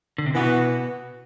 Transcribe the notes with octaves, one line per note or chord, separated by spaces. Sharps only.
D3
C3
B2 E3 B3 F#4